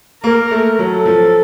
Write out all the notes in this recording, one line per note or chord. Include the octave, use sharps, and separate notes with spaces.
A#3 A#4
A3
F#3 A4
F3